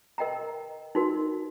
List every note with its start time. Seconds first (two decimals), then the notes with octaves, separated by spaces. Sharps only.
0.18 A#4 D#5 G5 A#5
0.95 D#4 F#4 A#4